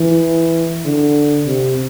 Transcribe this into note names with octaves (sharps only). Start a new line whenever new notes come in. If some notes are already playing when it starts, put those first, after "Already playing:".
Already playing: E3
D3
C3